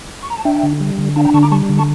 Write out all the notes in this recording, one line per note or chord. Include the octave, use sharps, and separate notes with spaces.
C#6
A#5
A5
D4 E5 G5
D3
G3
D3
D4 F5 A5
G5 A#5
D3 A5 C#6
A#5 D6
G3 A5 C#6
D3
A5 C#6